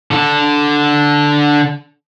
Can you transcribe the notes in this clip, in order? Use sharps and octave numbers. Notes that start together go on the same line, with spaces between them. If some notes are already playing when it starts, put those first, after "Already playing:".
D3 A4